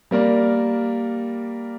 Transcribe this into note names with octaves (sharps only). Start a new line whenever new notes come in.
G3 A#3 A#4 D5